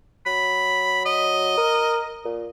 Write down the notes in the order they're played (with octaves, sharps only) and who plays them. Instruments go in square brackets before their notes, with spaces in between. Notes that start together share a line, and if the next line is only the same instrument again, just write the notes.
[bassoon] F#3 [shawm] B5
[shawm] D#5
[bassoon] A#4
A#2